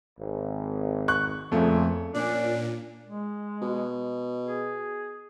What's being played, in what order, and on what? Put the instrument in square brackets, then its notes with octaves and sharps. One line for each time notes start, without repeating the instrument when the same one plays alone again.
[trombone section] G#1
[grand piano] C#6 F#6
[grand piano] F2 A3 [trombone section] A#2 C#3 F3
[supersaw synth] A#2 [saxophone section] C#4 D4
[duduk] G#3
[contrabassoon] B2
[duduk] G#4